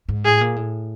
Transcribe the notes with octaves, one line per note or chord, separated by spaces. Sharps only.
G#2
A2 G#4
A#2
A2